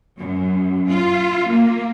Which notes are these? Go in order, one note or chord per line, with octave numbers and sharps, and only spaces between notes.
F#2
F4
A#3